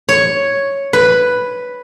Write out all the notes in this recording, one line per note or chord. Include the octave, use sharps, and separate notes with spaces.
C#5
B4